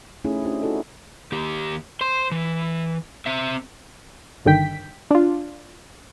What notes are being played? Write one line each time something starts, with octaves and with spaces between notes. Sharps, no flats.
A3 C#4 D#4 E4 G#4
C#4 D4 E4 F#4 G4 C5
D#4 E4 F#4 A4 D#5
D#2 G4
C5 C6
E3
C4 E5
G1 G2 D3 D#3 G5 B6
D4 F4